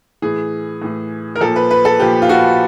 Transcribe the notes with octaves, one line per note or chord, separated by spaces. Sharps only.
A2 E3 G#4
A2 E3
A#4
A#2 F3 A4
B4
B4
A4
A#2 F3 G4
F4
F#4